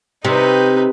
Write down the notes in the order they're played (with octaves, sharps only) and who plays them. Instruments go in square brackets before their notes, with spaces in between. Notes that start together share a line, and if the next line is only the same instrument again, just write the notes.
[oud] C3 [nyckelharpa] D#4 B4